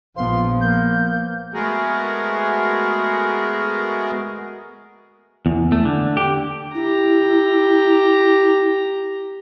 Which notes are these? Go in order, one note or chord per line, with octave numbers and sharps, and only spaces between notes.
A#1 F3 B3 C5 F5 C6
A#3 G6
G#3 A3 B3 F#4 G#4 A#4
E2
A3
D3
G4
E4 G4 A#5